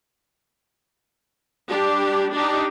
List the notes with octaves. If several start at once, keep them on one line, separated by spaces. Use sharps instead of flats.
G3 D4 G4
D4 D#4 G4